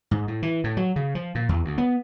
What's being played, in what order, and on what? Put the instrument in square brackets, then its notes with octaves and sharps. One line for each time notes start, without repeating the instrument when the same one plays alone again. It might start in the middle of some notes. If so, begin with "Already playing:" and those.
[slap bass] G#2
A2
E3
A2
F#3
C#3
F3
A#2
E2
D2
B3